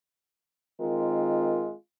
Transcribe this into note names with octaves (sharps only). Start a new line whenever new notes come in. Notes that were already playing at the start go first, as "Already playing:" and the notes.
D#3 G#3 C4 F4 A#4